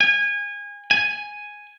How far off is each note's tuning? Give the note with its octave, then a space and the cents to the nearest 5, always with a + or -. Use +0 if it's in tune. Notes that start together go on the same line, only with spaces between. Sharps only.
G#5 -25
G#5 +0